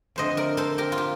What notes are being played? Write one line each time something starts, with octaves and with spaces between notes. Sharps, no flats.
F2 D3 A3 C5 D#5
A#4 D5
A4 C5
G4 A#4
F4
G4